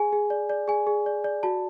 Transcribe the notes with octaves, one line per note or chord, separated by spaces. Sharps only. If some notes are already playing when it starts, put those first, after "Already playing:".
Already playing: G#4 G#5
G#4
D5
D5
G#4 G#5
G#4
D5
D5
F#4 A5